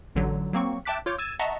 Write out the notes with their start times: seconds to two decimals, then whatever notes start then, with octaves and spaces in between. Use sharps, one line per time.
0.15 A1 D3 F#3
0.53 F#3 A#3 C4 C#6
0.85 E5 G5 A5 D6 F#6 B6
1.06 F4 C#5 D6 G6
1.18 E6 G#6 A6 D#7 E7
1.39 D#5 E5 F#5 A5 A#5 C#6